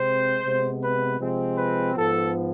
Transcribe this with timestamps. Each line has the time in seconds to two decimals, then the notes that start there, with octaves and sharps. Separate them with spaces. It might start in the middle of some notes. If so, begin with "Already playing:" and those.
Already playing: C3 G#3 C4 C5
0.42 C3 G#3 B3
0.81 B4
1.19 C3 F3 G#3 C4
1.57 B4
1.95 G#2 F3 B3 A4